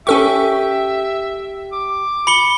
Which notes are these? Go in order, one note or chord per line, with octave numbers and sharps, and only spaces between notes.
C#4 G4 A4 E5 C#6
D6
B5 C#7 G7